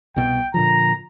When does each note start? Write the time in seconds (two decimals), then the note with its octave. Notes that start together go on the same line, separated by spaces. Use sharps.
0.16 C2 B2 G5
0.54 A#2 D3 F3 A#5